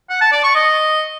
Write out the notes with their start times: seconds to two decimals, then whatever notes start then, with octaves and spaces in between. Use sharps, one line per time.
0.10 F#5
0.21 A5
0.32 D5
0.44 C#6
0.55 D#5